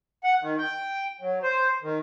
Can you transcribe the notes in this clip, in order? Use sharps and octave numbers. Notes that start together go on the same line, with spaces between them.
F#5
D#3
G5
F#3
C5
D#3